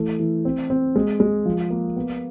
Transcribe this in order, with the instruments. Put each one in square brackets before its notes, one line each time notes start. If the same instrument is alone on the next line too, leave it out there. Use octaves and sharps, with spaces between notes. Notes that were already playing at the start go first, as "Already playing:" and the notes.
Already playing: [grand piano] E3 A3
E3
C4
C4
G#3
G#3
F3
A#3
B3